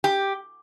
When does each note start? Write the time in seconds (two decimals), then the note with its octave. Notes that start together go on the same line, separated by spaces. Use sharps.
0.04 G4